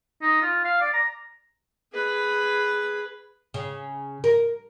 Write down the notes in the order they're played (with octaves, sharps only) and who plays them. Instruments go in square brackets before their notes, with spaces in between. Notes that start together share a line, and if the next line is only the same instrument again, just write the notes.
[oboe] D#4
F4
F5
D5
A#5
[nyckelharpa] G#4 B4
[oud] C#3
A#4